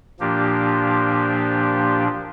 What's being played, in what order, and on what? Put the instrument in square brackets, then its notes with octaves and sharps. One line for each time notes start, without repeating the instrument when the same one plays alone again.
[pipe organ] A#2 F3 A#3 D4 G4